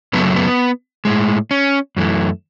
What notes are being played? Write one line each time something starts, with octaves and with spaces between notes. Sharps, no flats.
F#2 C#3 F#3 A3 B3
B3
A2 G#3
C#4
F#2 E3 A3